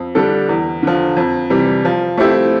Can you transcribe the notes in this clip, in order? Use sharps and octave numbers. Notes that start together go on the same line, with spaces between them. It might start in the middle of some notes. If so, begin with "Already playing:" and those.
Already playing: F2
D3 G3 D4 A4
E2
D3 F3
F2
C3 E3 G3
F3
A3 C4 E4 G4